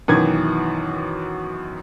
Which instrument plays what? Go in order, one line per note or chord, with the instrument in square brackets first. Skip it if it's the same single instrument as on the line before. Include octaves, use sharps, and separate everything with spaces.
[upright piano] F#2 B2 D#3 E3 G#6